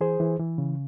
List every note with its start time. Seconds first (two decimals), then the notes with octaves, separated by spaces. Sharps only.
0.01 E3 G#4 C5
0.20 E3
0.39 E3
0.58 C#3